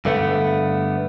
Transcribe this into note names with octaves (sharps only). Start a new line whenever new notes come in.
G2 D3 A3 B3